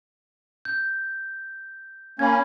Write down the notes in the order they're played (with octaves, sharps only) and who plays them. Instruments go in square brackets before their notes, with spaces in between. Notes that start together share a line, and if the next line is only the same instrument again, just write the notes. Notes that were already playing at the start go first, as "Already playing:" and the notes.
[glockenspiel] G6
[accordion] A#3 C#4 [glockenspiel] B5 G#6